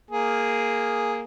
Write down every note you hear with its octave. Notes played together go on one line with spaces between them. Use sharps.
A#3 G#4